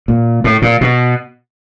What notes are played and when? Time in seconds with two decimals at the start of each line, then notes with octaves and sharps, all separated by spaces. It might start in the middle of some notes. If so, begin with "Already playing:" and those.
0.08 A#2
0.44 A2
0.62 A#2
0.81 B2